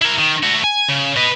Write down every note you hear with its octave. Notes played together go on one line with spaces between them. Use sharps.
E4 A#4
D#3
A3 F#4
G#5
C#3
B4 D#5